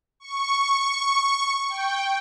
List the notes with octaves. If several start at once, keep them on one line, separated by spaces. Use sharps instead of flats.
C#6
G5